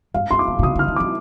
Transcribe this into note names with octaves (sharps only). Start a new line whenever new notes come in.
G2 F5
G2 C6
D6
A#2
A#2
C3 D#6
D3
F6
D#3
F3 D6